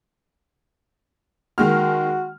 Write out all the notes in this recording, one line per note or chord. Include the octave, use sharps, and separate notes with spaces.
D#3 G#3 F#4 F6